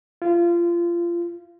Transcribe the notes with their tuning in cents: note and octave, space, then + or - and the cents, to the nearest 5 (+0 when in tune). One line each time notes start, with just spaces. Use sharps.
F4 -25